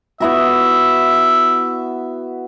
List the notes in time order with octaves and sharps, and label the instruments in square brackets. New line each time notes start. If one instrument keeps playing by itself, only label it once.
[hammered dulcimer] B3 E4 F#4 [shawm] E5